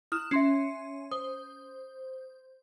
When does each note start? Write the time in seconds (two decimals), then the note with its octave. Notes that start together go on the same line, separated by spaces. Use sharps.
0.12 E4 D#6 F6 F#6 E7
0.31 C#4 E5 C6 C7
1.11 C5 D#6